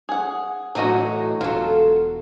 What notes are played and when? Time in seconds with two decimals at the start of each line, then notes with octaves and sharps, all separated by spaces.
0.09 G#4 F#5
0.75 A2 E3 F#3 F#4 D#5
1.41 E1 F#3 F4 A4